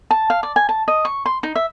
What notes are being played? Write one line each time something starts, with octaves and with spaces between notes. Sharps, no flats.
A5
F5
D5
G#5
A5
D#5
C#6
C6
D#4
E5